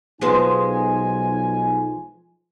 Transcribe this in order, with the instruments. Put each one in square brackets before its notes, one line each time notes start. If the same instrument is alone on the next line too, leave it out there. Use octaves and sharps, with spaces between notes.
[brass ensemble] B1 D#4 G#5 [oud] F3 G#3 B3